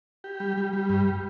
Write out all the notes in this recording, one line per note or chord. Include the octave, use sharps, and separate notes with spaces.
G4
G3
G3
G3
G2